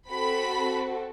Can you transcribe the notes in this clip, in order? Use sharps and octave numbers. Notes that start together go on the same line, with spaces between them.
C4 F#4 A4 B5